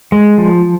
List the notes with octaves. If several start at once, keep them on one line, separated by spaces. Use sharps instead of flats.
G#3
F3